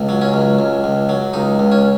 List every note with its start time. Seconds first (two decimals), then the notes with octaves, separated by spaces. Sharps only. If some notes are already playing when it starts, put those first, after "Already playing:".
Already playing: C#2
0.09 F#3
0.22 C#4
0.34 C#2
0.59 C#2
0.84 C#2
1.09 F#3
1.33 C#2 D#4
1.59 C#2
1.72 C#4